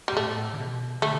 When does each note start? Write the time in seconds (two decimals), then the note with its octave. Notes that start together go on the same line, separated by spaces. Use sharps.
0.08 G3
0.12 B2
0.16 A2 A3
0.54 D3
0.60 B2
1.02 D3 A3